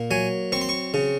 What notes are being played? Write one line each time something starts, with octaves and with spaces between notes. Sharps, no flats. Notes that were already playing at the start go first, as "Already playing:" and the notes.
Already playing: A#2 A#3
F#3 G#5
C4 C#6
C6
C#6
C#3